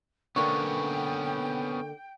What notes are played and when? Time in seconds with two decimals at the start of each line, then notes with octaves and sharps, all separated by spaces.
0.36 D3 A#3 B3 C#4 G5 C#6